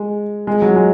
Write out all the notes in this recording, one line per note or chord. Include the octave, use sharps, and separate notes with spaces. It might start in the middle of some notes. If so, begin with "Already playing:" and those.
Already playing: G#3
G#3
F#3
G#3